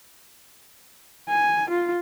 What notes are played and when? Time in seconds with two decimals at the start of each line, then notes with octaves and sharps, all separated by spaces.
1.29 G#5
1.70 F4